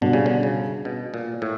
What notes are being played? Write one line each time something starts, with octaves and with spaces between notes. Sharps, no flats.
B2 D3 G3 B3 D4 F#4
C#3
D3
C#3
B2
A#2
A2